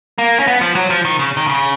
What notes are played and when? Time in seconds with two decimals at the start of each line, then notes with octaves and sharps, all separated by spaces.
0.18 A#3
0.40 C#4
0.47 B3
0.61 F3
0.75 F#3
0.90 F3
1.05 D#3
1.19 C#3
1.37 D#3
1.47 C#3